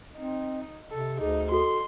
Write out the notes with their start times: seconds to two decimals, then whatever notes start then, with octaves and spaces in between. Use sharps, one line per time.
0.17 C4 D#4
0.91 C3 A4
1.21 D2 D#4 G#4
1.52 F#4 A4 C6